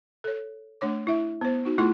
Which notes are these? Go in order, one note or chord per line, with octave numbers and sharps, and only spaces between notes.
A4 C#5
A3 D4 C#5 D6
E4 E5
B3 C5
D#4 F#4
A3 E4 F4 G#4 C6